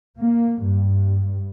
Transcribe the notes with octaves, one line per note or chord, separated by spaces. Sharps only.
A#3
G2